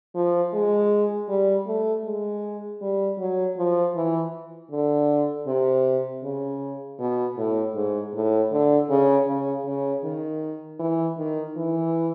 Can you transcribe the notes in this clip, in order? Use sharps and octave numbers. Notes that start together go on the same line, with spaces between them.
F3
G#3
G3
A3
G#3
G3
F#3
F3
E3
D3
C3
C#3
B2
A2
G#2
A2
D3
C#3
C#3
C#3
D#3
E3
D#3
E3